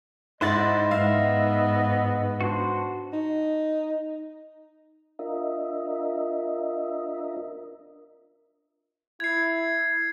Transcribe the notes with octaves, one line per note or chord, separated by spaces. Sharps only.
G#2 E4 C5 D#5 F#5 A6
G#2 B3 E5 F5
D4 F#4 C5
D#4
D4 F4 A#4 D#5 E5
E4 G#6 C7